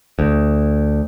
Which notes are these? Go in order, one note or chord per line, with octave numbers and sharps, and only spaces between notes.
D2